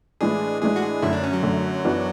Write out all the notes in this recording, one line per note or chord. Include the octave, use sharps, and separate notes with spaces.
A2 E3 G#3 D4 G#4
A2 E3 G#3 D4 G#4
F#4
G#4
F#2 D3 A3 E4
D4
C#4
F#3
F#2 D3 A3
F#2 E3 B3 D4 F#4